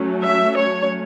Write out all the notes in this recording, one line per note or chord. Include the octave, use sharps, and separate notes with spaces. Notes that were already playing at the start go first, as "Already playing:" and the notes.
Already playing: F#3 A3 C#4
E5
C#5